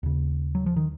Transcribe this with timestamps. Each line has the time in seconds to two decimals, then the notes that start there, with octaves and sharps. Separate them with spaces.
0.03 D#2 C#3
0.55 F#3
0.66 F3
0.76 D#3